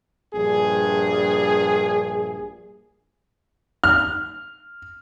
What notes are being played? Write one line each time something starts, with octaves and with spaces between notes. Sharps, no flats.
A#1 G2 G#4
F6